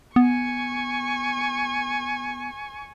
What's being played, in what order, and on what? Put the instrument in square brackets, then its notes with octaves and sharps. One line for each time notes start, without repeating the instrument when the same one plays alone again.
[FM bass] B3 [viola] G#5 C#6